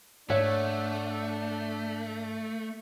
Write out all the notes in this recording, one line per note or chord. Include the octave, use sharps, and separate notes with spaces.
G#2 A3 D4 C#5 E5 F#5 F#6